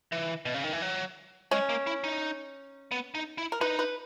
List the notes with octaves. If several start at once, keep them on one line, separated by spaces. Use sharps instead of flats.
E3
B2
C#3
D#3
E3
F#3
G#3 C#4
A#3
E4
D#4
B3
D#4
E4
A#4
D#4 B4
B4